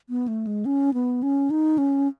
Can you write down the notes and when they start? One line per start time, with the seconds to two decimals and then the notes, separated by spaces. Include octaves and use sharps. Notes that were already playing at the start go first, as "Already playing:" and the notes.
0.09 B3
0.28 A3
0.47 G#3
0.65 C#4
0.94 B3
1.23 C#4
1.50 D#4
1.78 C#4